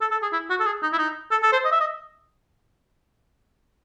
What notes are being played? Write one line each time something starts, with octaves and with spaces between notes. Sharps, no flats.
A4
A4
G#4
E4
F#4
A4
G#4
D#4
E4
D#4
A4
A4
C5
D#5
E5
D#5